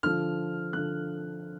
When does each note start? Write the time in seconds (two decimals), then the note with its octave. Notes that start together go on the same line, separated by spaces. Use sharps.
0.03 D3 F3 F6
0.73 D3 F3 F#6